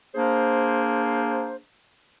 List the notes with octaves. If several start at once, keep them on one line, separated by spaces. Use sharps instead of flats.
A#3 D4 G#4 C5